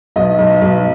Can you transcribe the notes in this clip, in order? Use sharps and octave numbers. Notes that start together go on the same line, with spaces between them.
B1 D#5
B1
B1